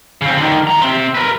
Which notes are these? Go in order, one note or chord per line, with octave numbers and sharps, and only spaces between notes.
C#3 C4
D3 D#3
E3 A#5
C3 C4
A#4 B4